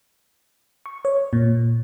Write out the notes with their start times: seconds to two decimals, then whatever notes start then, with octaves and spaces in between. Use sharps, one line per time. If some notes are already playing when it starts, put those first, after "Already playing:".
0.86 C#6
1.05 C#5
1.33 A#2